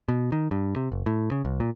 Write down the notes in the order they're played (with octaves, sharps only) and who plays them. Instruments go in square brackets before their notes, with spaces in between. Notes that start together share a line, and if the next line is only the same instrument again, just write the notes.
[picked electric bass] B2
D#3
G2
C3
F#1
A2
C#3
C2
A#2